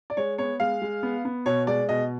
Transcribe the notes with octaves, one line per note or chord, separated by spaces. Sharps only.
D5
G#3 C#5
B3 C#5
G#3 F5
G#3
B3
B3
B2 C#5
G#3 D5
B2 D#5